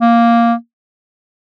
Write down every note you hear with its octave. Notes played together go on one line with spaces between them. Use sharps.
A#3